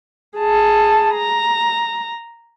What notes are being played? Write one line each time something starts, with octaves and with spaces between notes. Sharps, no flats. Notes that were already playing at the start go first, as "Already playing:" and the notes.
G#4 A5
A#5